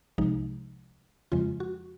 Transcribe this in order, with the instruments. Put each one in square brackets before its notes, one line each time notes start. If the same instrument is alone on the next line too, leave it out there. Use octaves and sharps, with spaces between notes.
[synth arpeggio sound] C2 C3 F3 G#3 D#4
F2 C#3 F3 G#3 F4
F#4